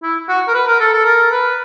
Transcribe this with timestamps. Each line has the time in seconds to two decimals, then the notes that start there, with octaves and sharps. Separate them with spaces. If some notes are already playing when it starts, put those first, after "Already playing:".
0.03 E4
0.29 F#4
0.48 A#4
0.54 B4
0.67 A#4
0.80 A4
0.93 A4
1.05 A#4
1.31 B4